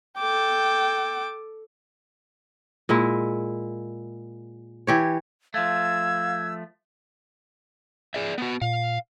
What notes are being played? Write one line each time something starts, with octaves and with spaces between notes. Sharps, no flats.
A4 G5 D6
A#2 G#3 E4
E3 G4 C#5
F3 A3 F5 E6 G#6
G#4 D5 E5
B3 F#4
A#2 F5